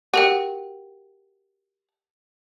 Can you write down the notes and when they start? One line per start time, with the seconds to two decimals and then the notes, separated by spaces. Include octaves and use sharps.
0.14 F#4 G4 A#4 G5